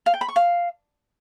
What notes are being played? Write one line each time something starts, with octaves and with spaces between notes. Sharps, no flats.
F5
G5
B5
C#6
F5